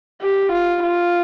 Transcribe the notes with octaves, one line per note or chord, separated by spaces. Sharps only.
G4
F4
F4